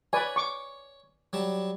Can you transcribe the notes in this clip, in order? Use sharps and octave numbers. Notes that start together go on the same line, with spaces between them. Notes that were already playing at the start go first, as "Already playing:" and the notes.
B4 C#5 D5 G#5
C#6 D6
F#3 G3 A5